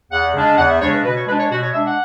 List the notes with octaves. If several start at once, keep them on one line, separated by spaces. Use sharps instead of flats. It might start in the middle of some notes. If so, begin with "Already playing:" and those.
E2 F#5
C#3 G#3 D4
E2 F#5
E5
C#3 G#3 D4 C#5
B4
B2 B4
C#5
G#3 D4 B4
C#5
B2 F#4
C#5
G#3 D4 E5
F#5